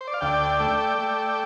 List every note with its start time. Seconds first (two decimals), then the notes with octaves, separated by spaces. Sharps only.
0.01 C5
0.07 D5
0.14 F5
0.21 D2 D5 G5
0.60 A3
0.99 A3